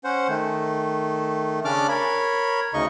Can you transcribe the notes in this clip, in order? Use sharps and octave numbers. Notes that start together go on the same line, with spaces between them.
C#4 C5 F#5
D#3 A3
C#3 C#4 D4 D5 D6 F6
A#4 C#5 B5
D2 C#3 D#4 D#5 C#6